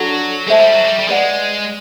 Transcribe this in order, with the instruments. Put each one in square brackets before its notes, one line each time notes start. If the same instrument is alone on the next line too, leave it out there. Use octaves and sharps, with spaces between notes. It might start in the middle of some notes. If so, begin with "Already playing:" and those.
Already playing: [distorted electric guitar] F#3 [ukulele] D4 F#4 A4
[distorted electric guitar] G#3 [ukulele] A4 C5 E5 A5
[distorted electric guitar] G3
F#3
G3
G3
[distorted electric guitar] G#3 [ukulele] B4 D5 F#5